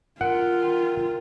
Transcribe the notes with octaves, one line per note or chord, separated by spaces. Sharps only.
F4 A#4 F#5 D7
A#4 G5